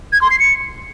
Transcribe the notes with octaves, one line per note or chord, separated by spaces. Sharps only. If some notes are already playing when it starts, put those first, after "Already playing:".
G#6
C6
C7
C#7